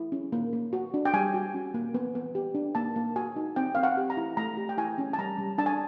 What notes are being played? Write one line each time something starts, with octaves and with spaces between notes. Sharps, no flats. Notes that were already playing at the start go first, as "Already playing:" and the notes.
Already playing: E4
C#4
A#3
A#3
F#4
D4
G5
G3 G#5
F#4
C#4
A#3
B3
B3
G4
D4
A#3 A5
A#3
F#4 G#5
D#4
C4 G5
C4 F5
F#5
G4
A#5
E4
A3 A#5
G4
G5
E4 G#5
C#4
A5
G3 A#5
G3
D4 A5
G#5